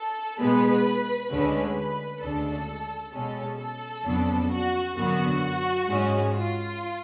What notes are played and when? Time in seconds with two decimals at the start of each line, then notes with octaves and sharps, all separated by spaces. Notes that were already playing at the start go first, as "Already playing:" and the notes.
Already playing: A4
0.39 B2 G#3 B3 B4
1.30 D2 D3 G#3 C#4 B4
1.75 B4
2.21 D2 C#3 G#3 D4 A4
3.12 B2 G#3 C#4 A4
3.57 A4
4.03 F2 C#3 F#3 B3 D4
4.49 F#4
4.95 F#2 D3 F#3 B3 F#4
5.86 G#2 G#3 C#4
6.31 F4